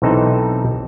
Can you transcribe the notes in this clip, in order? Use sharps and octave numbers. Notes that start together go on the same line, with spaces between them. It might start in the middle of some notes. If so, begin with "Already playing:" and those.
B1 E3 C4 D#4 A4